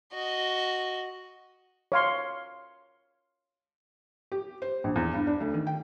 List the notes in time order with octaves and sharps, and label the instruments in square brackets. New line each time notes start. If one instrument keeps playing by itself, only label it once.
[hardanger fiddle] F#4 D#5
[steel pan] C#5 F5 C6
[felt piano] G4
C5
A#1
E2
G2
D4
D2
D#3
G5